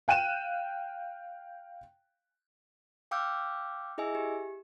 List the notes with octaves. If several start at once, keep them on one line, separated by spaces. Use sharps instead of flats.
F5 G5 F#6 D#7 E7
F5 G5 D6 E6 F6 G6
E4 G#4 D#5 E5 G#5 E6
G4